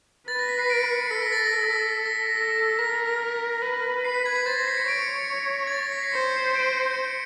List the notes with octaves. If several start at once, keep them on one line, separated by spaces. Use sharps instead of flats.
B4 A6
A#6
B6
C7
D7
C#7
C#7
C7
A4 B6
A#6
A6
A#6
B6
A#6
A#6
A4 A#6
A#4 A#6
B4
C7
B6
G#6
G#6
C5 A6
A#6
C7
C#7
C#5 D7
C#7
G#6
A6
A#6
B6
C7
C5 C#7
D7
C#7
C#7